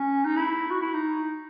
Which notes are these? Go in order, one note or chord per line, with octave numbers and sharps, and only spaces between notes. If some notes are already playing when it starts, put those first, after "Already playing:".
Already playing: C#4
D#4
E4
F#4
E4
D#4